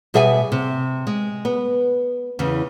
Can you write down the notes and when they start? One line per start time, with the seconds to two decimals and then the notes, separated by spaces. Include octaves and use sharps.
0.14 B2 G3 G#4 E5 F#5 G#5
0.52 C3
1.07 G#3
1.45 B3
2.39 E2 C#3 E3